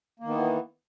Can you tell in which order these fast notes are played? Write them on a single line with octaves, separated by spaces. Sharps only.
A#3 D#3 B3 E3